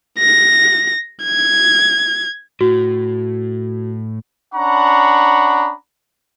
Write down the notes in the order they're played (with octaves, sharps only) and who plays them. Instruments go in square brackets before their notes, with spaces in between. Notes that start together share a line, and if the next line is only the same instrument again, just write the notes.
[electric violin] A#6
G#6
[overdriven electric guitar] A2 [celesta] F#4
[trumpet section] C#4 D4 F#5 A#5 B5 C#6